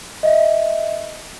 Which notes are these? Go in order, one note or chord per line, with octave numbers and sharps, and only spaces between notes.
D#5 E5